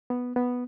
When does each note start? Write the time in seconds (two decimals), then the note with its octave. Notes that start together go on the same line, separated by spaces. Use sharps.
0.10 B3
0.36 B3